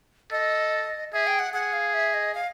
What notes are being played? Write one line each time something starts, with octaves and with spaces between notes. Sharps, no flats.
A4 D#5
G#4 E5
G5
F#5
G#4 F#5
F5
E5
D#5
F5